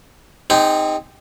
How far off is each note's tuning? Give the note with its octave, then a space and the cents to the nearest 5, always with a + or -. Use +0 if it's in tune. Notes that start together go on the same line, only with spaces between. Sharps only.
C4 -15 D#4 +0 G#4 -45